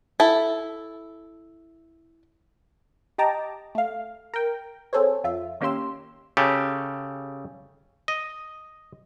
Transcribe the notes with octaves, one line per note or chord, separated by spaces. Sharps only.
E4 A4
G4 D#5 G5 A5 A#5 D6
A3 F5
A#4 G5
C4 G#4 A4 C5 C#5
F2 F4 E5
D#3 A#3 C#4 G4 C6 E6
C#3 G4 A4
D#5